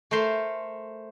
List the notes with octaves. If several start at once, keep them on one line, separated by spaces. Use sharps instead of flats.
A3 A#4 C5 C6